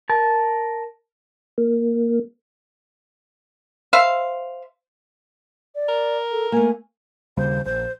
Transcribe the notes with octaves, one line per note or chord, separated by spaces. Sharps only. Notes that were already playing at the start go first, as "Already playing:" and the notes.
A#4 A5
A#3
C5 E5 F5
D5
A#4
A4
A3 A#3 G#5
D#2 C#3 G3 C5
A#1 C5